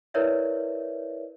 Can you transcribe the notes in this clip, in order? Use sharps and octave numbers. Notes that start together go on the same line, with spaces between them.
E4 A#4 B4 C#5 D5 E5